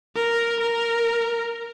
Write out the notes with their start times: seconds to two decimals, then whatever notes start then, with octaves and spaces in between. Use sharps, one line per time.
0.16 A#4
0.60 A#4